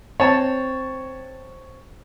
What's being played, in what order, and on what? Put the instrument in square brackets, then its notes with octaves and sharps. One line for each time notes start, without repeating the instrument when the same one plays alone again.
[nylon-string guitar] C4 [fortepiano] C#5 A5